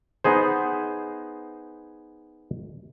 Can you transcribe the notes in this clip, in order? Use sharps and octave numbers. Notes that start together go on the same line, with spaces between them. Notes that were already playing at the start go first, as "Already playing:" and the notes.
B3 D#4 G#4 C5